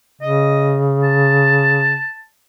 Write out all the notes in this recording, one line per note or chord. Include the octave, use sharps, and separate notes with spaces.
C#3 D#5
A5